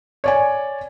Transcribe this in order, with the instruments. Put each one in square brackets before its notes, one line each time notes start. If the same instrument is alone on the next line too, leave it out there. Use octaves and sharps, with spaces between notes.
[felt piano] C#5 D5 G#5